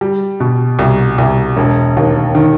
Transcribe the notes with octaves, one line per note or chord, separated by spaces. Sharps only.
G3
B2
C2
C2
E1
D#2
D#3